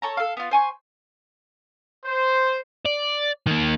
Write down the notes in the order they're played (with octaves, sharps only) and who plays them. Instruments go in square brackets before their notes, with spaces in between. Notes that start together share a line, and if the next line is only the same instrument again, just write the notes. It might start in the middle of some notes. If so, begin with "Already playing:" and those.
[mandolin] A4 C#5 A#5
A4 F5
B3 F4
C5 G#5 C#6
[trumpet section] C5
[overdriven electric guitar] D5
D#3 A#3